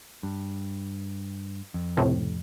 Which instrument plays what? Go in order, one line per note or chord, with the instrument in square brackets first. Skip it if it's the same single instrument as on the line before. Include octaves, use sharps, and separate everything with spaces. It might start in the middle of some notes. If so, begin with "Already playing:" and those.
[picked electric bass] G2
F2
[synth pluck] C#2 A2 C3